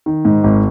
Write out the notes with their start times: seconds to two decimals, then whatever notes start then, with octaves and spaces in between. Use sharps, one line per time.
0.06 D#3
0.25 G#2
0.44 G#1